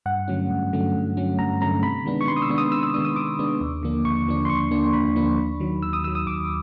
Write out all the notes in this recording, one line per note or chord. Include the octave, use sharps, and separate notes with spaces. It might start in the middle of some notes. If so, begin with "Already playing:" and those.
G2 F#5
D3 F#3 A3 C#4
G2
D3 F#3 A3 C#4
G2
D3 F#3 A3 C#4
G2 A#5
D3 F#3 A3 C#4 A#5
C3 B5
D#3 G#3 B3 D4
C#6
C3 C6
D#6
E6
D#3 G#3 B3 D4
D#6
C3 E6
E6
D#3 G#3 B3 D4 D#6
D#6
C3 D6
D#3 G#3 B3 D4
D#2
D3 F3 A#3 D4
D#2 C#6
D3 F3 A#3 D4
C6
D#2 C#6
D3 F3 A#3 D4
D#2 B5
D3 F3 A#3 D4
D#2
D#3 F#3
D#2 E6
D#6
D#3 F#3 E6
D#6
D#2 D6